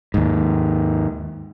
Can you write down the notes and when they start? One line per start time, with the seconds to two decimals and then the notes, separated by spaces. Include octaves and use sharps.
0.14 D#2 G#2